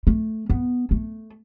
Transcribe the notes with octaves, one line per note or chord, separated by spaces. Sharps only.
A3
B3
A3